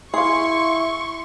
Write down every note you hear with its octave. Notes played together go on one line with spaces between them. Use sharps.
E4 G#4 F5 C6 C#6